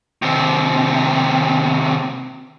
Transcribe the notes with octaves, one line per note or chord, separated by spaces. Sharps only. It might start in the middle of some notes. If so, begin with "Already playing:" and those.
D#2 C3